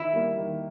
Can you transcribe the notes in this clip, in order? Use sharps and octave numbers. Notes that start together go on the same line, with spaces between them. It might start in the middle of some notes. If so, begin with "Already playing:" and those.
Already playing: D#3 E4
G3 A#3
D#3